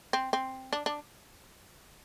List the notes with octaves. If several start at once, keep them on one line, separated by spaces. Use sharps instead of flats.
C4
C4
D4
D4